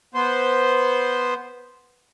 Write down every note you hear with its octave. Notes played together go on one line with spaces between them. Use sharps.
B3 C5